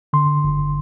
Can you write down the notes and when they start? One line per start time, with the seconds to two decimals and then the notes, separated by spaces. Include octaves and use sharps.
0.13 D3 C6
0.44 G1